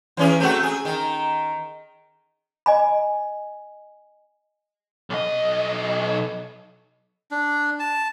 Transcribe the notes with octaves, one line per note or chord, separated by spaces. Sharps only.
E3 C#4 G#4
A3 C4 F#4
G#4
D#3
D#5 G#5 B5
B1 D#5
D4
A5